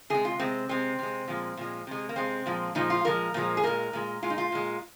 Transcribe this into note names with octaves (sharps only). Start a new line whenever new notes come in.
C3 G#3 G#4
F4
C3 G#3 C4
C3 G#3 C4
C3 G#3
A#2 F3 G#3
A#2 F3 G#3
C3 G#3
A#3
C3 G#3 C4
A#2 F3 G#3
A#2 F3 G#3 D#4
F4
A#2 F3 G#3 A#4
A#2 F3 G#3
G#4
A#2 G#3 A#4
A#2 G#3
A#2 G#3 F4
D#4
F4
A#2 G#3